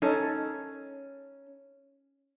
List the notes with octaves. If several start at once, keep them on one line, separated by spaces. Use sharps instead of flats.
C#4 D#4 A4